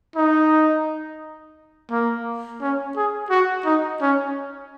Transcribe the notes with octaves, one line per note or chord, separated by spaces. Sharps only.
D#4
A#3
C#4
G#4
F#4
D#4
C#4